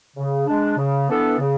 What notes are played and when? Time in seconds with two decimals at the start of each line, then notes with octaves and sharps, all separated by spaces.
0.17 C#3
0.47 G#3 D4
0.78 C#3
1.09 E3 B3 D4 A4
1.39 C#3